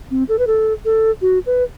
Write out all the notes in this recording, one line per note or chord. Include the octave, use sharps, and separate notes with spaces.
C4
A4
B4
A4
A4
F#4
B4